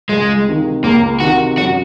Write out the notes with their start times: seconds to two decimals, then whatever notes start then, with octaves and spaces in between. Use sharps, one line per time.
0.09 C#2 G#3
0.46 C3 D#3
0.83 C#2 A#3
1.20 C3 D#3 F#4
1.58 F#2 F#4